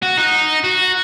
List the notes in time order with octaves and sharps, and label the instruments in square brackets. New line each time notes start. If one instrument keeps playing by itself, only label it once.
[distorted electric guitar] F#4
D#4
F#4